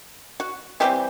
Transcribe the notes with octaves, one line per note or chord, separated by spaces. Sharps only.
F#4
E3 G3 C4 G4